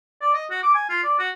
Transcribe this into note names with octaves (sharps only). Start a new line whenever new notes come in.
D5
D#5
F#4
D6
G#5
F4
D5
F#4